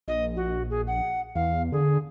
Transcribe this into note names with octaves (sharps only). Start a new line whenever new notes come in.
A#1 D#5
F#4
G#4
F#5
E2 F5
D3 G#4